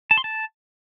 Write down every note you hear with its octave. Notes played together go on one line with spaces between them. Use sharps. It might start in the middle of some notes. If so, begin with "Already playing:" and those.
A5
C6
A5